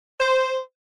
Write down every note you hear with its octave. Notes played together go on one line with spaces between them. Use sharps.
C5